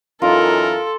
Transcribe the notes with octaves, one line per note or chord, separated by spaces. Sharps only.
F#2 E3 D#4 F4 A4 A#4